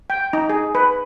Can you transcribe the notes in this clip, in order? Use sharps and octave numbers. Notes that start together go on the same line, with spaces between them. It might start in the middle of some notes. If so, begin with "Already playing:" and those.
G5
D#4
G#4
B4